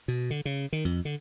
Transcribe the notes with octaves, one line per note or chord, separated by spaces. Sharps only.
B2
D3
C#3
D#3
F2
D3